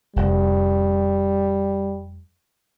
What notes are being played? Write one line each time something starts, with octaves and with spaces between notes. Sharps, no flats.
F1 G3